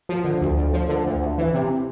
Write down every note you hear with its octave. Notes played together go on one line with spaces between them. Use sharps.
F3
D3
D2
D2
F3
D3
D2
D2
E3
C3